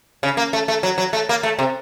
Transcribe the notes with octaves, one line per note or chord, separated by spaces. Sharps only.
C#3
A#3
A3
A3
F#3
F#3
A3
A#3
A3
C3